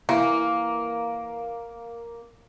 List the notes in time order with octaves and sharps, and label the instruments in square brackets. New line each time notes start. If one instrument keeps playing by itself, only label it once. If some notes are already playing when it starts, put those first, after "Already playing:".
[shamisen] E3 [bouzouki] A#3